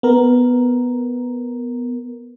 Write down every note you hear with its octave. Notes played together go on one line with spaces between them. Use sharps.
B3 A#4